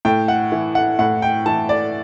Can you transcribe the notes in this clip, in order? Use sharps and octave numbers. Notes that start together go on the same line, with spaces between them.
A2 G5
F#5
E3
F#5
A2 F#5
G5
E3 A5
D5